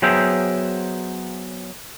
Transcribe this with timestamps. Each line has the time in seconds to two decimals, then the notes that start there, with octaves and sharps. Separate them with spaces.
0.02 F#3 B3 G#4 C5 E5 G5